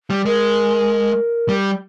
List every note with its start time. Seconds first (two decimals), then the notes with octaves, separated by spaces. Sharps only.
0.10 G3
0.25 G#3 A#4
1.49 G3